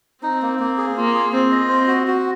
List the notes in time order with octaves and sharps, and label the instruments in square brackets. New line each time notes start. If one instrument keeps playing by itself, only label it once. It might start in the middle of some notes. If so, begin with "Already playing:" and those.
[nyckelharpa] C4 [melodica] D#4
[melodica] A#3
A#3
G#4
[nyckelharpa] A#3 [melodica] F4
[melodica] G#4
[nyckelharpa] C4 [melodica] F4
[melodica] D#5
[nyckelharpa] C4 [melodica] C5
[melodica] F#4
F#4